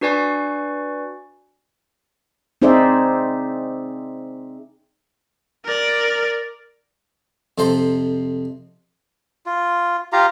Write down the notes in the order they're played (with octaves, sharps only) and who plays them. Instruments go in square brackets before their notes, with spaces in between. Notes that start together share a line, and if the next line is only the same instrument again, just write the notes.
[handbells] D4 F#4 B4 D5 G#5 C#6
[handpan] C4 D#4 G#4 C5 D5 E5
[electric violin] A#4 D5
[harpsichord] F2 C3 A4 C5 A#5 C6
[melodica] F4
F4 G4 F5 A#5